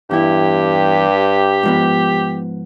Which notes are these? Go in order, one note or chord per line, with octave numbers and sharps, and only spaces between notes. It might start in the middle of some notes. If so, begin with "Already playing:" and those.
E2 G2 E4 G4
G#2 F3 B3